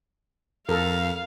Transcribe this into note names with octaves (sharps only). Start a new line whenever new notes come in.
F2 A4 A#4 F5